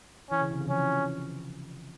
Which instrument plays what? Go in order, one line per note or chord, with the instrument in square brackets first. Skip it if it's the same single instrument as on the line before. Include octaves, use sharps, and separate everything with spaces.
[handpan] E3 [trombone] C#4
[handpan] C#3
C3
C#3
E3
[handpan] F3 [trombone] C#4